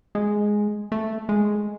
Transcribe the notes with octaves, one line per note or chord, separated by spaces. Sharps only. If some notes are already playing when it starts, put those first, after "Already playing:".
G#3
A3
G#3